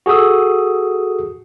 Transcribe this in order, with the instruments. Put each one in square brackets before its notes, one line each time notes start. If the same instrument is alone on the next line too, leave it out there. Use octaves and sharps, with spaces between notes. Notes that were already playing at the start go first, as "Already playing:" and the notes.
[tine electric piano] F#4 G#4 A4 D#6 E6